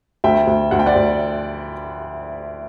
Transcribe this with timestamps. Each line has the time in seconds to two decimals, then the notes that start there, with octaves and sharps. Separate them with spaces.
0.24 D2 E5 G5
0.47 D2
0.71 D2 F#5
0.79 G5
0.86 D5 F#5
0.95 D2